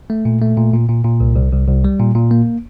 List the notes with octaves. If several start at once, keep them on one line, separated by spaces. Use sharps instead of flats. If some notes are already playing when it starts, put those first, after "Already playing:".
A3
A#2
A3
A#2
A#2
A#2
A#2
C2
C2
C2
C2
G3
A#2
A#2
A#3